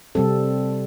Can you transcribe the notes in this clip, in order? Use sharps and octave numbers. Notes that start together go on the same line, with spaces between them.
C3 G3 C4 A4